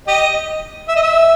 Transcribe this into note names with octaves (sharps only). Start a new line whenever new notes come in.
G4 D#5
E5
D#5
E5